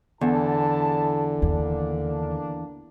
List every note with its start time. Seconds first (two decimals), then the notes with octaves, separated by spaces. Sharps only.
0.21 E2 D3 E4 G#4 A5
1.42 D#2 A#3 D4